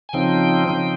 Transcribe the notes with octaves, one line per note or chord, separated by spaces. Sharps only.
G#5
C#3 F3 C4 D#4 G5
C#3 F3 C4 D#4